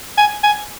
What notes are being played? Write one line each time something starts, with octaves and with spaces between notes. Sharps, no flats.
G#5
G#5